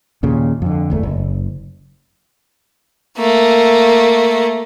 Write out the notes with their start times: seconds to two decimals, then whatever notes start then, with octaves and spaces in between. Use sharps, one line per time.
0.23 D#2 A#2 C#3
0.62 F2 D3
0.90 G1 E2 A3
1.03 F#1
3.17 A3 A#3